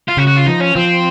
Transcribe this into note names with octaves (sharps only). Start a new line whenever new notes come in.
F4
C#3 F#4
F#4
F4
F3 D#4
C#4
F3 C4